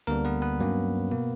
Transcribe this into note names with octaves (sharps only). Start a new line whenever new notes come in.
D2 D3 G3 A#3 B3 D4 A#4
B3 B4
B3 B4
G2 F#3 A#3 C#4
B2 A#3